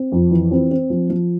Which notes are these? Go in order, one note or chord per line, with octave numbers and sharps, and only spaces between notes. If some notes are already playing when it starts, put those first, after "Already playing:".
Already playing: C4
F2
E3
C4
C4
F3
F3